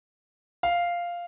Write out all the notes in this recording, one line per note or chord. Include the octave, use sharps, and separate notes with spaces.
F5